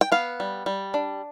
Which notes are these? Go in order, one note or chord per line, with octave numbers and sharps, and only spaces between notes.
G5
B3 F5
G3
G3
D4